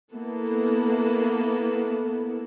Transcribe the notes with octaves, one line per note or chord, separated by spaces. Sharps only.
A#3 B3 E4 A4